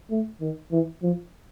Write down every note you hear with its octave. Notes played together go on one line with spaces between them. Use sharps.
A3
D#3
E3
F3